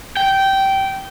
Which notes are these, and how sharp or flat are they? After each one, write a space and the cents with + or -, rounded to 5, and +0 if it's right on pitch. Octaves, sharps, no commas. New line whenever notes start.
G5 -15